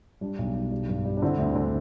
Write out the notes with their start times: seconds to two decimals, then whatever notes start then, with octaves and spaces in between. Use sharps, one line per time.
0.21 G3 D4
0.39 B1
0.55 B1
0.72 G3
0.89 G2
1.05 G3
1.17 D4
1.22 D3 C4 E4
1.38 D2
1.56 D3